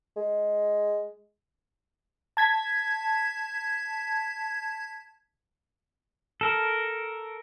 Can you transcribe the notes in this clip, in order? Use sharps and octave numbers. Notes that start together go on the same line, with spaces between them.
G#3
A5 G#6 B6
A4 A#4